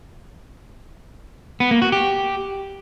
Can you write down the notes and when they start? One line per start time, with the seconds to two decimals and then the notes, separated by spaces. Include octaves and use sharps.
1.60 B3
1.71 A#3
1.82 F#4
1.92 G4